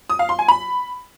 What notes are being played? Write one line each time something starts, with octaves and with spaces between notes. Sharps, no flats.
D#6
F5
C6
G#5
B5